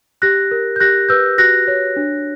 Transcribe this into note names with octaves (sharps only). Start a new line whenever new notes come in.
G4 F#6 A#6
A#4
G6
G4 F#6 A#6
B4 E6 G6
F#4 F#6 A#6
C#5
D4